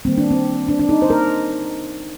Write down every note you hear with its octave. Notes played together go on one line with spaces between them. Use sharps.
D#3 G3 A#3 C4
D4
C4
D4
D4
D#4
C5
A#4